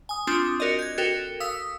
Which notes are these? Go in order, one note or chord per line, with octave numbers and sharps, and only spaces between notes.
G#5 D#6
C4 D4 F4 D6 D#6
F#4 A#4 D5 D#5
G6 G#6
F#4 A4 A#4 G5
F5 D#6 E6 B6